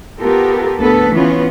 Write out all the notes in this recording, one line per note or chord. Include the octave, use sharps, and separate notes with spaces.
B3 F4 G4 A4 A#4
D2 B3 A4 B4
E3 B3 C#4 F4